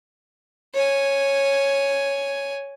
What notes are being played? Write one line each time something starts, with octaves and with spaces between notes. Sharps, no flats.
C#5 G#5